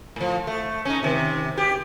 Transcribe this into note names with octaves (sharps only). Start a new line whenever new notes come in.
A2 F3
A3
C#4 D#4
C3 D#3
G4 G#4